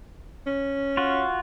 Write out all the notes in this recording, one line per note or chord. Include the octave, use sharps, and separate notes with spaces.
C#4
F4 F#4